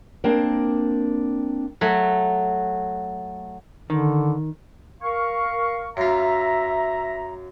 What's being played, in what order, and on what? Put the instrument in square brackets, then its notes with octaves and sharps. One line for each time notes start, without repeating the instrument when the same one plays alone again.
[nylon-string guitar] A#3 C4 D4 A#4
[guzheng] F#3 A3
[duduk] D3 [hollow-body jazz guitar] D#3
[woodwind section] A#4 F5 C#6
[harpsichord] F#2 F4 [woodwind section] E5 A#5